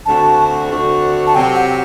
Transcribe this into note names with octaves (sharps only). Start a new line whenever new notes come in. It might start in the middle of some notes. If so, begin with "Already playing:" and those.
D2 D3 A3 C4 F#4 A5
D2 D3 A3 C4 F#4
A5
C3 F#3 C4 G4 G5
F#5